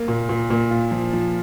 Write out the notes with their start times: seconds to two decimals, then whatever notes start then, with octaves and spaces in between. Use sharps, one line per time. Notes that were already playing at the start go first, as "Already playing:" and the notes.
Already playing: A#3
0.08 A#2
0.29 A#2
0.50 A#2
0.71 F4
0.91 F3
1.13 F3